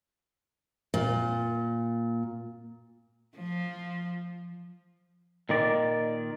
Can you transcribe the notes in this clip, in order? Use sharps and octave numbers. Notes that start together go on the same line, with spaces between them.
A#2
F3
A#2 D#3 D5